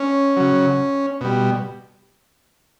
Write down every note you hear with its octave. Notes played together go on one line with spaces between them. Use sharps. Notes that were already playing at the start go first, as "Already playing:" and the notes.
Already playing: C#4
C#3 F#3
B2 G3